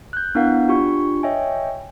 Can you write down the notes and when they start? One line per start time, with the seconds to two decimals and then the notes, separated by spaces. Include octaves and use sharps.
0.13 F#6 G6
0.35 B3 D4 E4 A#4 F5 F#5
0.68 D4 F4 G4 C#6
1.23 C#5 D#5 E5 G5 G#5